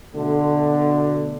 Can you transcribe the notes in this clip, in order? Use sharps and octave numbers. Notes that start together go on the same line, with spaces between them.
B2 D3 A3